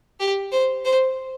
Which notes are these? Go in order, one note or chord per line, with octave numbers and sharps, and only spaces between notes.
G4
C5
C5